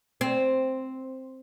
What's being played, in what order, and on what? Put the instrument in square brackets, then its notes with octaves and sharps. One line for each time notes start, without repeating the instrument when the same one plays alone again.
[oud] C4